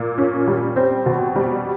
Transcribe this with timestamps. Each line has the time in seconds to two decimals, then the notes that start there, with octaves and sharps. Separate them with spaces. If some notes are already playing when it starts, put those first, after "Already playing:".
Already playing: A#2
0.18 C#4
0.47 G3
0.76 C4
1.06 B2
1.36 G3